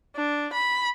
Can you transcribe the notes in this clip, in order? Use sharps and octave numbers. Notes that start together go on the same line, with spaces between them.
D4
B5